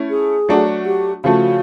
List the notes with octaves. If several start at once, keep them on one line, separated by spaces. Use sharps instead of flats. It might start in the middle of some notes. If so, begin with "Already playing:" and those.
Already playing: A3 C#4 E4
G#4
F#3 A3 D4 F#4
G4
C#3 F3 A3 F#4